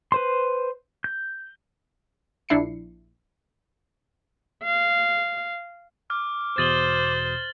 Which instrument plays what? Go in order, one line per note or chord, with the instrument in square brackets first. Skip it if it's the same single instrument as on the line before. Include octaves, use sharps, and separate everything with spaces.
[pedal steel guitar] B4 C5 C6
G6
[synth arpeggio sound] A#1 D4 E4 C7 C#7
[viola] F5
[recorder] D6 [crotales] F6
[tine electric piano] E2 B2 D#6 [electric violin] C5 [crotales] A6 F#7 G7